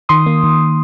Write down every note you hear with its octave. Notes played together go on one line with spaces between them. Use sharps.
D#3 C6 D#6
A#3
D#3